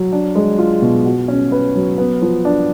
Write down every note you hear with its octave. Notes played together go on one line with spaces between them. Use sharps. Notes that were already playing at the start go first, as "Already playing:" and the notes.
Already playing: F#3
D4
G#3
F4
B2
F#4
C#4
B4
F#3
B3
F3
D4